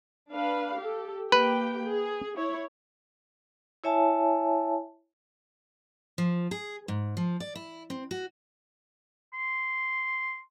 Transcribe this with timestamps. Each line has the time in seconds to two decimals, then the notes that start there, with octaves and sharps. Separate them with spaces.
0.30 D4 B4 F5
0.77 G4 A4
1.32 A#3 G4 B4 G5
1.87 G#4
2.36 E4 C#5
3.84 E4 C#5 E5 G#5 A5
6.18 F3
6.51 G#4
6.88 G#2
7.17 F3
7.40 D5
7.55 E4
7.90 C4
8.11 F#4
9.34 C6